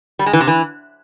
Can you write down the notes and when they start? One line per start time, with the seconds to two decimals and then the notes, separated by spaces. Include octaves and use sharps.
0.19 G3
0.26 G#3
0.33 E3
0.40 C3
0.48 E3